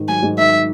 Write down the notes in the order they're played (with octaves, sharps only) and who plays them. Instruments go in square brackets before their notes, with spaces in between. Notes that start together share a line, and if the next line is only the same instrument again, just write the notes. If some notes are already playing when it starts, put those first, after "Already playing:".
Already playing: [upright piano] G#2 D#3
[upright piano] F#3 [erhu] G#5
[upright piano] G#2
[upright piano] D#3 [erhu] E5